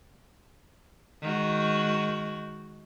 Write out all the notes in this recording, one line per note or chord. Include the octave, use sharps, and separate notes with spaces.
D#3 G#3 F#4